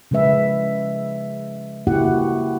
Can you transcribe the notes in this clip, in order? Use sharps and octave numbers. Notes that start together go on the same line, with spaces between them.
C#3 F3 G#3 B4 E5
C#3 A#3 E4 F#4 G4 F#5